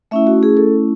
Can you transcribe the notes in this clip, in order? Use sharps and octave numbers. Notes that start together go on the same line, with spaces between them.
A3 C#4 E4 E5
F#4
G#4
A4